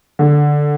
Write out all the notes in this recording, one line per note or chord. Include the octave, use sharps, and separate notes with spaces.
D3